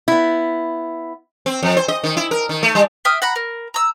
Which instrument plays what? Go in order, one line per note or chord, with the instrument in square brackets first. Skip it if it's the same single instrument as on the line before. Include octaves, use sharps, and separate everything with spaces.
[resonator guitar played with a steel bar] B3 E4
[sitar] C4
F2
C5
D#5
D#3
E4
A#4
D#3
A3
G3
[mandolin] E5 G5 D#6 F6
F#5 A#5 B5
A#4
A#5 E6